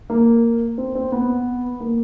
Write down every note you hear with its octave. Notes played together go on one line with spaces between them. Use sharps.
A#3
C4
C4
B3
A#3